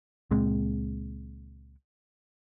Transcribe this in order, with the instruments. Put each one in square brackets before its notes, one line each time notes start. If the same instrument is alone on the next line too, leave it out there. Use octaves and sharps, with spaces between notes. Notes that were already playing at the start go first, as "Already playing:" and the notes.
[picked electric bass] C#2 A#2 G#3 C4